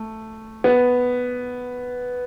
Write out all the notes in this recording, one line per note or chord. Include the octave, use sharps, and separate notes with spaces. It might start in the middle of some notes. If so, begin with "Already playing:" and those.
Already playing: A3
B3